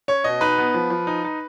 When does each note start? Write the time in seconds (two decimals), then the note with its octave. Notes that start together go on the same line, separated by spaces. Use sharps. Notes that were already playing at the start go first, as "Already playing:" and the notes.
0.08 C#4 C#5
0.24 B2 D#5
0.41 D#4 B4
0.58 B3
0.74 F3
0.90 F3
1.07 D#4
1.24 D#4